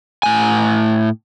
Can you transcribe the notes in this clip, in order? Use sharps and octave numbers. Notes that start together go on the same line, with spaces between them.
A2 G#5